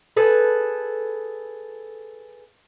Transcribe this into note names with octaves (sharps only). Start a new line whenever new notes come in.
G#4 A4 B4